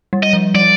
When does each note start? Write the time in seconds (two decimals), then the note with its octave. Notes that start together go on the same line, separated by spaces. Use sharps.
0.13 G3
0.23 D#5
0.33 F3
0.54 G3 D5